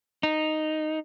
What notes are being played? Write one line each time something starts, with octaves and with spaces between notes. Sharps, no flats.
D#4